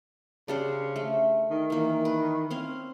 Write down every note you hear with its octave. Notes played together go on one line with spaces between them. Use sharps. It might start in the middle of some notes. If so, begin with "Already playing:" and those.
C#3 D4 G4 C5
A3
D#3
E3 A#3
B4
C4 C#4 F5